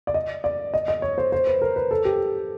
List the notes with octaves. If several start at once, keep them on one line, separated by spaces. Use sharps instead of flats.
D5
D#5
D5
D#5
D#5
C#5
C5
C5
B4
A#4
B4
A4
G4